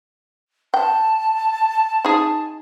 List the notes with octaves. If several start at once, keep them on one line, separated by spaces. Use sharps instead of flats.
G5 A5
D#4 G#4